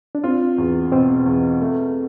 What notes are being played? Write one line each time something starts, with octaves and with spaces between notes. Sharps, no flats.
D4
C4 F4
E2
B2 C4
E2
A3